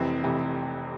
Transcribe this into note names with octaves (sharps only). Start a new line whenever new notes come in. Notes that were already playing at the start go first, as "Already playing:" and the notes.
Already playing: F1 F2 C3 E3 C4
F1 F2 C3 E3